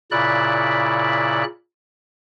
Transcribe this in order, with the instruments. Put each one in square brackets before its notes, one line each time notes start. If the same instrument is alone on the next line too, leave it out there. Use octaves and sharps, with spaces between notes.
[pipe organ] A#2 C#3 E4 D5 B5 F#6